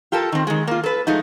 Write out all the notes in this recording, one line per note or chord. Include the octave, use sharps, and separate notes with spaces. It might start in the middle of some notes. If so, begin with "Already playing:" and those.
F4 G4 A4 A#4 A5
D#3 C4
D#3 G#3
A#3 F4
A4 B4
F3 G#3 A3 D#4